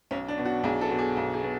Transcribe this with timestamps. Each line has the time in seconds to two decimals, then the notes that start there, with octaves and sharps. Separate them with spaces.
0.11 B1 C#4
0.28 D4
0.38 B2
0.45 F#4
0.63 B1 G#4
0.81 A4
0.90 B2
0.99 G#4
1.17 B1
1.34 G#4
1.43 B2